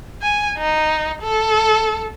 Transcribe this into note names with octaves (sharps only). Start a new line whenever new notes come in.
G#5
D#4
A4